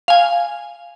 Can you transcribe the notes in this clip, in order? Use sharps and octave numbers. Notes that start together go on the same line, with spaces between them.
F5 G#5